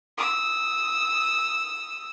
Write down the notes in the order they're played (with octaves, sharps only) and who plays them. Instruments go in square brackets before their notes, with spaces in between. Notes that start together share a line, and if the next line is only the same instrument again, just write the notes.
[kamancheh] D#6 E6